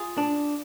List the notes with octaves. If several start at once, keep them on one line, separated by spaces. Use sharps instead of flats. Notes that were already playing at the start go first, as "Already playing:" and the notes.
Already playing: F4 G#4
D4